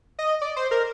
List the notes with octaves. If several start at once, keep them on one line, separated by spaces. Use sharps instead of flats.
D#5
D5
C5
A#4